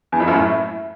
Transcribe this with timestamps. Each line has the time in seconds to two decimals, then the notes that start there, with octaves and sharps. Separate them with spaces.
0.12 E2
0.20 F2
0.28 F#2
0.35 A2